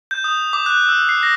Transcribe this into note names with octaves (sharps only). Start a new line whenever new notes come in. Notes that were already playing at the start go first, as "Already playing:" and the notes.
G6
D#6
D6
F#6
E6
C7
A#6